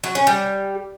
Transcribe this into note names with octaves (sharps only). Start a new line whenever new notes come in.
F#3
C#4
G3